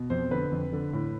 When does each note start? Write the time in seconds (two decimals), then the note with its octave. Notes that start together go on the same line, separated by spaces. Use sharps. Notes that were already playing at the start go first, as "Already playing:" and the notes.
Already playing: B2
0.10 F2 C5
0.31 D3 B4
0.51 F2
0.73 D3
0.93 A2